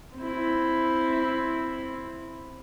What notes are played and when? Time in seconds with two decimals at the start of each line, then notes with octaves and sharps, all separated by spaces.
0.18 C4 E4